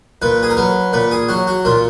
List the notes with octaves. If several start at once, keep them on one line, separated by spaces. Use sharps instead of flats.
A#2 B4
G#4
A#4
F#3 B4
A#2 B4
G#4
F#3 F#4
F#4
A#2 F4